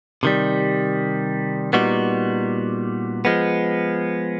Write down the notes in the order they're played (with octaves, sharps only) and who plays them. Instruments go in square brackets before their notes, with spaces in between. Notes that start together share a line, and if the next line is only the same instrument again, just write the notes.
[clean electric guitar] C3 D#3 G3
A#2 G3 B3 D#4 F#4
F3 G#3 B3